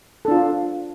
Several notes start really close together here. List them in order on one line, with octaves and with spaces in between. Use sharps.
A4 D4 F4